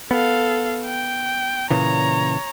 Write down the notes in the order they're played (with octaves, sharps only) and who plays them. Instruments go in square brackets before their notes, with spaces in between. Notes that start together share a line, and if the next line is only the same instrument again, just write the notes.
[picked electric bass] B3 [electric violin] A4 F5
[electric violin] G5
[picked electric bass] A#2 C#3 E3 [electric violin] C#5 A#5